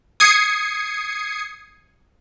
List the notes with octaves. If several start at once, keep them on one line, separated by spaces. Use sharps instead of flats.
D#6 G#6 C7 C#7